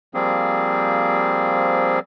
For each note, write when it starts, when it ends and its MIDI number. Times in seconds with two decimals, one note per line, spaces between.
0.14 1.99 53
0.14 1.99 55
0.14 1.99 58
0.14 1.99 60
0.14 1.99 68